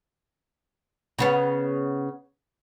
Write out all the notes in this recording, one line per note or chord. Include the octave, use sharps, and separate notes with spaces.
C#3 B3 C#4